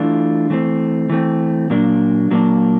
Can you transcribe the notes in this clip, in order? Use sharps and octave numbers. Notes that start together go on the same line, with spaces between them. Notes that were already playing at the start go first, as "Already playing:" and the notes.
Already playing: E3 A3 D4 F4
E3 A3 C4
E3 A3 C4
A#2 F#3 A#3 D4
A#2 F#3 A#3 D4